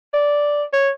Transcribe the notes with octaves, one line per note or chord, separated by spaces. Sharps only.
D5
C#5